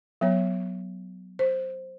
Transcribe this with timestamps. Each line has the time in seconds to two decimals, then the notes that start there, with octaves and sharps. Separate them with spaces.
0.21 F#3 B3 C#5
1.39 C5